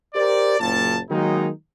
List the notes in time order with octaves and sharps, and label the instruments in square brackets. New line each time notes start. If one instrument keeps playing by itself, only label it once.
[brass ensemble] G4 A#4 C5 D5
F#1 A#2 A5
D#3 F#3 G#3 A#3 D#4